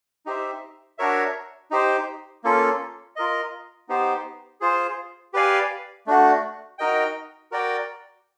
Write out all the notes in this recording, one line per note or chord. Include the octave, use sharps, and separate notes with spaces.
D#4 G4 C5 E5
D4 F#4 A#4 C#5 E5
D#4 G4 C5
A#3 C#4 F4 A4
F4 A#4 D#5
B3 D#4 G4 C5
F4 G#4 C5
G4 B4 D5 F5 G#5
A3 D4 F#4
D#4 F#4 A#4 D#5 G5
F#4 A#4 D5 G5